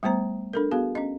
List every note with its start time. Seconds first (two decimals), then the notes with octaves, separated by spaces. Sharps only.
0.03 G3 A3 B3 C5 A#5
0.53 D4 A4 A#4
0.71 B3 F#4 G#4 F5
0.95 C#4 D#5